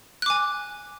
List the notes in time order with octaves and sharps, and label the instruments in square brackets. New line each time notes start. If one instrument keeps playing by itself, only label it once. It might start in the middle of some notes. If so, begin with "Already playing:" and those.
[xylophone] F#6
D6
G#5